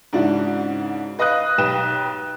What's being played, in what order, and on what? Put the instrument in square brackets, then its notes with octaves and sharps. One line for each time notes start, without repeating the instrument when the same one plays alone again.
[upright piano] G#2 C#3 D4 E4 F#4
B4 D#5 F5 D#6 F#6
B1 G4 B4 G5 E7